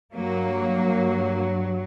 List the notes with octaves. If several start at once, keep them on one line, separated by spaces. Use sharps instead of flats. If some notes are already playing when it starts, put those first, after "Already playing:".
G2 F#3 A#3